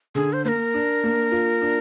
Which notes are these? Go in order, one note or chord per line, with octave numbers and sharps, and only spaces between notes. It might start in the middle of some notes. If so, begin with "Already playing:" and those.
D3 G#4
C5
A#3 A#4 C5
D4
A#3
F4
D4